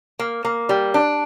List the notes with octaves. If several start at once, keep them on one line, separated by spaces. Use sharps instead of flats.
A#3
A#3
G3
D4